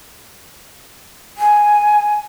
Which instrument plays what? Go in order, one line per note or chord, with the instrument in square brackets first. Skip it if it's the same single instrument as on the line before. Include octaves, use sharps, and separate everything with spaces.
[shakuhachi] G#5